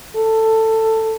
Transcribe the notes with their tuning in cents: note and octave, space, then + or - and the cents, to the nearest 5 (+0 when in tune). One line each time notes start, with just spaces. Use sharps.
A4 +15